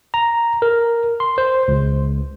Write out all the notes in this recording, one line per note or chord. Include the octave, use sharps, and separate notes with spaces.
A#5
A#4
C6
C5
C#2